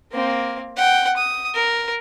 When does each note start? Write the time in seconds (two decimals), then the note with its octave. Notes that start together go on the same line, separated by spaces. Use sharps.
0.13 A#3 C4
0.77 F#5 G5
1.17 D#6
1.55 A#4